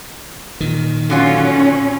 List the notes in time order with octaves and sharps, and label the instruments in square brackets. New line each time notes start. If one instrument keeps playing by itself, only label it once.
[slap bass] A#2 D#3
[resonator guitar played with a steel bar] D3 F#3 F4 [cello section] C#4